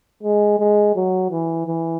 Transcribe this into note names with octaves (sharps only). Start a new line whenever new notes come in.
G#3
G#3
F#3
E3
E3